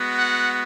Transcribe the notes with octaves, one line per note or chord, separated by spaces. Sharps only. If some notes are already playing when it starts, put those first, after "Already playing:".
Already playing: G#3 B3 F#4
F#5